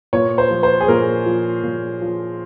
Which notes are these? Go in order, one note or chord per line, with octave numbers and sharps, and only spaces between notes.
A#2 C#5
C5
F3
C5
G#4
A#2 A#4
F3
A#2
F3